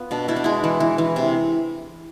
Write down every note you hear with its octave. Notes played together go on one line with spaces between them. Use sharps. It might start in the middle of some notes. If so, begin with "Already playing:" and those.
Already playing: B3 F4
B2 D4
B2 E4
D4
G#3 E4
E3
E3
E3
C3